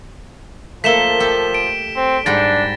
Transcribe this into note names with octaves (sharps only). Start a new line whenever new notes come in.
F3 A3 A#3 A4 B6 E7 G7
G4 A4
D7
C4
G#2 G3 D4 F#5 A6 A#6